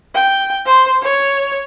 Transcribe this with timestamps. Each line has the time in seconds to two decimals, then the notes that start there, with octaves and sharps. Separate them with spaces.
0.15 G5
0.66 C5
1.02 C#5